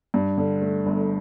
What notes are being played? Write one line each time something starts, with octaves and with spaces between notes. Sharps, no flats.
G2
D3
A3
G1